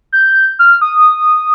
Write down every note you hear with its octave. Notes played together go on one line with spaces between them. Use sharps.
G6
F6
D#6